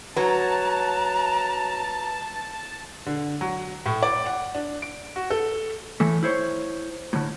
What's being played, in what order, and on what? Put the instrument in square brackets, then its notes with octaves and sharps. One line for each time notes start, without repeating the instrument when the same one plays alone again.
[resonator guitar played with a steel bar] F#3 [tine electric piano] B4 [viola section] A5 [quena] A#5
[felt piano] D3
F#3
A2
D5
F#5
D4
D7
F#4
A4
[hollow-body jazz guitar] A2 E3 A3
E4 C5 C#5
A2 D3